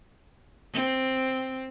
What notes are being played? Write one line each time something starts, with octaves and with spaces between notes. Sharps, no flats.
C4